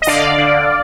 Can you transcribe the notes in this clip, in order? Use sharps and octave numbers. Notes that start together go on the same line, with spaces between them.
D#5
D3 D5 F5
D3